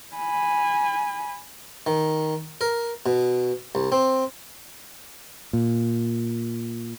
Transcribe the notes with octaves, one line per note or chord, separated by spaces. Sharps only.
G#5 B5
D#3
A#4
B2
C2
C4
A#2